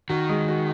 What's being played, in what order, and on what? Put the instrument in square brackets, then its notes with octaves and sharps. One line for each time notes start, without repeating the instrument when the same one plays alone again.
[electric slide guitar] D#3 [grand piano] F#4
[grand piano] G#3
F#4